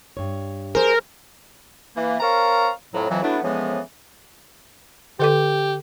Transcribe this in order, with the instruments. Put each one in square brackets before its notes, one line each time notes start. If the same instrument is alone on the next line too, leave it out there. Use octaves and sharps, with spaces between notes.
[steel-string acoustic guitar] G2 C#5
[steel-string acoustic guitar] G#4 C5 [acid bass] A#4
[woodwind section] E3 A#3
C4 A#4 C#5 F5 A5 A#5
F2 A2 F#3
F2 E3 F#3
F#3 A3 B3 D4 E4
A2 C#3 E3 F3 G#3 B3
[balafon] D3 A4 D6 [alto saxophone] G4